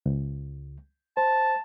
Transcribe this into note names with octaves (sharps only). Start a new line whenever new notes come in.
C#2
C5 A5